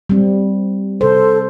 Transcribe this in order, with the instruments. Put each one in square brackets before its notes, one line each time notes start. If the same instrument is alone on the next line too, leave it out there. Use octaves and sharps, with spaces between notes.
[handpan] G3 C4
[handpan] C3 C5 [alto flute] A4